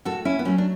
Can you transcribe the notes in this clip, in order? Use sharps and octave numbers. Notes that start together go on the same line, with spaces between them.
A2 F#4 A4
C#4 E4
B3
F#3 A3 C#4
D4